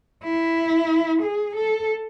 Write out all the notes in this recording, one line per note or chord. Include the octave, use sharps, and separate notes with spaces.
E4
G#4
A4